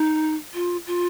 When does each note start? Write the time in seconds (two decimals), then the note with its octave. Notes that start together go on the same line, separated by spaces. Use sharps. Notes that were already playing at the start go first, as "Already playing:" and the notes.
Already playing: D#4
0.54 F4
0.87 F4